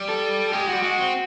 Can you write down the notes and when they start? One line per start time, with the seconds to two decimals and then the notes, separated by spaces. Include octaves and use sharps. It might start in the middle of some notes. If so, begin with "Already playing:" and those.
Already playing: G3
0.09 A4
0.52 G#3 G4
0.68 G3 F#4
0.82 G#3 F#4
0.97 C4